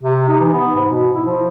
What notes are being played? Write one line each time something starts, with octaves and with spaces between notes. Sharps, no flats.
C3
D#4
E3
B3
G#2
B2
E4
F3